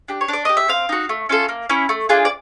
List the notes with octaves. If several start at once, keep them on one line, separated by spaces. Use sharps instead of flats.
D4 G4
C#5
D4 D5
G4 D#5
E5
C4 F5
D#4 F#4
A3
C#4 F4 A4
A#3
C#4 E4
A3
D4 F4 G#4
D5